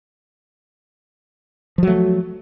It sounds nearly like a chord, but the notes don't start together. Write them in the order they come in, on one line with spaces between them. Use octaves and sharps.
F3 F#3 A3